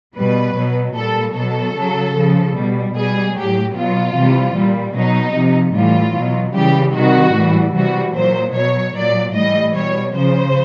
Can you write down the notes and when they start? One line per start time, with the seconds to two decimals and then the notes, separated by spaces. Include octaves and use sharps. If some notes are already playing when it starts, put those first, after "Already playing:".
0.16 B2 G3 B4
0.56 B2 F#3
0.96 A#2 G3 A4
1.35 B2 F#3 A4
1.75 C#3 F#3
2.16 C#3 F3
2.56 B2 G3
2.95 B2 G3 G#4
3.36 A2 F#3 G4
3.76 B2 F#3 F4
4.15 C3 E3 G3
4.56 A#2 G3
4.95 B2 F#3 D#4
5.36 C3 F3
5.75 A2 E3 G3 F4
6.16 B2 F#3
6.55 C#3 E3 G3 G4
6.95 C3 D#3 G3 F#4
7.35 A2 E3 G3
7.75 C3 E3 G3 F#4
8.15 A#2 F#3 C5
8.55 B2 F#3 C#5
8.95 A#2 F#3 D5
9.35 A2 E3 G3 D#5
9.75 B2 G3 C#5
10.15 C#3 F3 C5